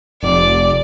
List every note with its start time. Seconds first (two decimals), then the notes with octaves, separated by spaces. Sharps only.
0.23 F1 D5